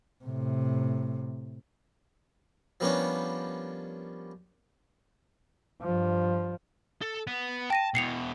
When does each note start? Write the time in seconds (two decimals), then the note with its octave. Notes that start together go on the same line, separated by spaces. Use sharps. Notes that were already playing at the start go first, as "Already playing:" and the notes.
0.24 A2 C3
2.80 F3 G3 A#3 B3 C#4 D4
5.81 G2 F3
7.02 A4
7.27 B3
7.70 G5 A5 A#6 D#7
7.95 E2 B2 C7 C#7 F7